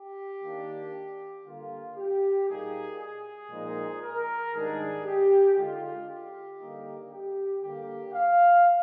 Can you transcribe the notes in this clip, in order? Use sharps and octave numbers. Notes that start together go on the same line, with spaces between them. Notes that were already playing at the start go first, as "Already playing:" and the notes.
Already playing: G4
D#3 A#3 D4
D3 G3 A#3 F4
G4
A#2 G3 A#3 D#4 G#4
G#4
A#2 F3 G#3 D#4
A#4
G#2 D#3 G3 D4 G#4
G4
D3 G#3 D#4 F4
G4
D3 G3 A#3 D#4
G4
D3 G3 A#3 G4
F5